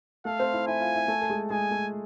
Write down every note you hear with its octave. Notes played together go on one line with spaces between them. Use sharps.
A3 A4 F5
C4 C5
E4 E5
E4 E5 G#5
F4 F5
E4 E5
A3 A4
A4
G#3 G#4
G#3 G#4 G#5
A3 A4